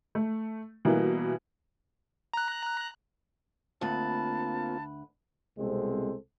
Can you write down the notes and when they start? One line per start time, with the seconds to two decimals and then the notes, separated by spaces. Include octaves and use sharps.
0.15 A3
0.85 B2 E3 G3 A#3 E4
2.34 A#5 F#6
3.81 D2 A#3 C4 F4 B4 A5
5.58 C2 B2 G#3 C4 A4 C5